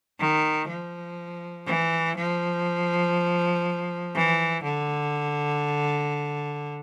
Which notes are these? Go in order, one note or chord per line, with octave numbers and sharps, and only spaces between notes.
D#3
F3
E3
F3
E3
D3